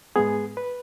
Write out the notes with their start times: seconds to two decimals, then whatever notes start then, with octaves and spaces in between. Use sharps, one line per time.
0.16 G#2 G#3 B3 G#4
0.57 B4